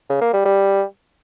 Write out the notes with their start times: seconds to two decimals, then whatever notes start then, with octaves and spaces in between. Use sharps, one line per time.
0.10 C#3
0.22 A#3
0.33 G3
0.45 G3